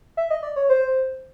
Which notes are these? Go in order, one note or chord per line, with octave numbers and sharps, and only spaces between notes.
E5
D#5
D5
C#5
C5